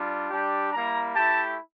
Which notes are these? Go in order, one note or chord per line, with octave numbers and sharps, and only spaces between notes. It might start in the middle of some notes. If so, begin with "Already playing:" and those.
Already playing: G3 D4 F4
G3 D4 G4
G3 A#3 E4 A#5
A3 E4 G4 A5